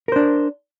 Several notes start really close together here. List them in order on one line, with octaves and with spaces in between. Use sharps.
A#4 C5 D4